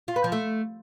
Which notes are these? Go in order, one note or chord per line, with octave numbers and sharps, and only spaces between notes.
F4
B4
F3
A3